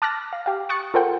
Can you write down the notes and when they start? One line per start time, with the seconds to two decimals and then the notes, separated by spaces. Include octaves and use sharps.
0.02 A5 D6 F6 F#6 A6 A#6
0.33 F5
0.46 G4 F5
0.69 C#6 D#6 F#6 A6 C#7
0.94 F4 A4 A#4 C5 F#5 G5